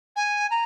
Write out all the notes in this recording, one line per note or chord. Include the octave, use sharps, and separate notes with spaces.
G#5
A#5